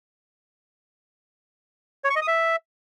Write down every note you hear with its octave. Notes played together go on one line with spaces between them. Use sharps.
C#5
C#6
D#5
D#6
E5